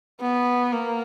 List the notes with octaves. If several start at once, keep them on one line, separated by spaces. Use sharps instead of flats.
B3
A#3